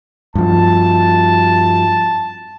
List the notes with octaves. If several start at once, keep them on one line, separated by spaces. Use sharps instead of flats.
G2 F3 A5